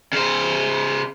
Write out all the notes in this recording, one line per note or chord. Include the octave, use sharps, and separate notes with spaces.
C#3 C5